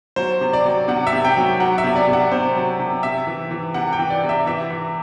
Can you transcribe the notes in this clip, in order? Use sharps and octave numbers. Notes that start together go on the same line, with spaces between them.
F#3 C5
C3
D5
F#3
C3 F#5
E5
C3
G5
F#3
F#3 F#5
E5
C3
D5
C3
F#5
C3 C5
F#3
C3
C3 E5
E3
E3
C3 F#5
G5
E3
D5
C3
E5
E3 E5
E3